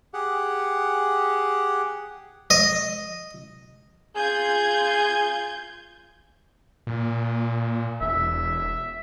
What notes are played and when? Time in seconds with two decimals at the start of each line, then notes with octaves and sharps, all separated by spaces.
0.14 G4 G#4 F#5
2.50 D#5
4.16 F4 G#4 G6 G#6
6.87 A#2
8.01 E1 E5